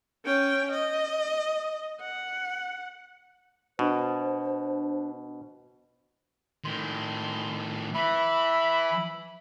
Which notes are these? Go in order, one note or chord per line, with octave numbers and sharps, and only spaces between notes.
C#4 G5
D#5
F#5
B2 D4 C5
A2 D#3 C6
E3 E5 B5